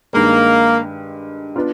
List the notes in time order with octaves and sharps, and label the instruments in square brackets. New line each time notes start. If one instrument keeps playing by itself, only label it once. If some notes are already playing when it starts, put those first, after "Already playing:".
[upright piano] G2 D#3 G#3 [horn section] A#3
[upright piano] B3 D4 F4